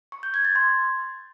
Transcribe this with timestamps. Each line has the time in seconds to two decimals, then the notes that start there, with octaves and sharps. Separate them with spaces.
0.12 C#6
0.23 G6
0.34 G#6
0.45 A6
0.56 C6